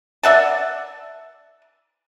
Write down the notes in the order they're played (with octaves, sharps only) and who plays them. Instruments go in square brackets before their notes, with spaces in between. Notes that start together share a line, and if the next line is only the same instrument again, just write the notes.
[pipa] D5 E5 F#5 A5